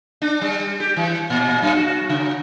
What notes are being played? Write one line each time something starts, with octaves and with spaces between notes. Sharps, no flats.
D4
G3
G4
E3
A#2
F#2
F#4
C#3